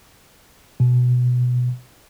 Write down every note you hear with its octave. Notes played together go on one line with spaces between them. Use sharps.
B2